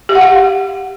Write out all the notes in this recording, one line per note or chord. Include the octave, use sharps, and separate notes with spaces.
G4
F#5
F5